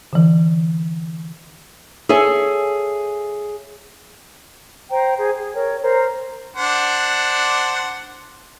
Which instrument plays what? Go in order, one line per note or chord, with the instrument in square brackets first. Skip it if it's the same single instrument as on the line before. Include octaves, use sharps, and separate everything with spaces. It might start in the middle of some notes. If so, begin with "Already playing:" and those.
[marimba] D3 E3
[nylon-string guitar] G#4 A4 C#5 E5 G#5
[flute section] C5 G5 A#5
G#4 C5
G#4
A#4 C#5 G5
A#4 C5 A#5
[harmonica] D4 C5 F#5